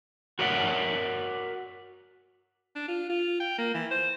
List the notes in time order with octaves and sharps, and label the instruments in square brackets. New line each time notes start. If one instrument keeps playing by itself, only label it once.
[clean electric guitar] F#4 A#4 C#5 D5 E5 F#5
[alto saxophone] D4
F4
F4
G5
A#3
E3
C5